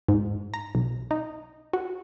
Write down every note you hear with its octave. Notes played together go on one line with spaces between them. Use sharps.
G#2
A#5
B1
D#4
F#4